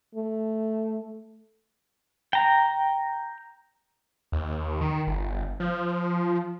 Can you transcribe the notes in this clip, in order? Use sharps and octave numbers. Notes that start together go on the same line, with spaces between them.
A3
G5 A#5
D#2
D#3
G1
F3